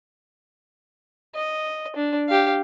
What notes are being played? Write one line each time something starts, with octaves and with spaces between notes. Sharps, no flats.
D#5
D4
G4 F5